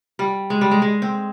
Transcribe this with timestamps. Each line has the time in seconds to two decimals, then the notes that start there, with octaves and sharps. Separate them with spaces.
0.19 G3
0.50 G#3
0.61 G3
0.71 G#3
0.82 G#3
1.02 C4